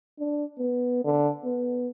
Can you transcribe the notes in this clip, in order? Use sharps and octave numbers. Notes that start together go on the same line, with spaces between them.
D4
B3
D3
B3